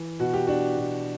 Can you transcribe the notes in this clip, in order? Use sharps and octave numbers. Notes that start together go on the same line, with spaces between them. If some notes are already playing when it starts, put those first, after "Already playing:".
Already playing: E3
B2 F#4
G4
D4 F#4
B2